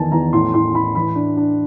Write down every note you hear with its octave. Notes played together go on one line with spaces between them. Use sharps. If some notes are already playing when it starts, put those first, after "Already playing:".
Already playing: E2 D#3 G#5 A5
E2 A#5
A2 C6
A2 C6
A2 B5
E3 B5
D4
D4